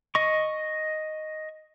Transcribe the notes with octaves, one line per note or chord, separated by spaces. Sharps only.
D#5 C#6